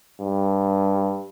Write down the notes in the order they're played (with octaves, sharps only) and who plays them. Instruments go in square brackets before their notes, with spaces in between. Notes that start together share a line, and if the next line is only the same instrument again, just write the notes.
[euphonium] G2